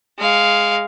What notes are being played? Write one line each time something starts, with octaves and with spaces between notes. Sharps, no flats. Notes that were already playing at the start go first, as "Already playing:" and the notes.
G#3 F5